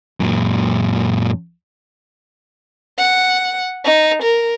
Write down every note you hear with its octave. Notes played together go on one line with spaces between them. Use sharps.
F#2 A#2
F#5
D#4
A#4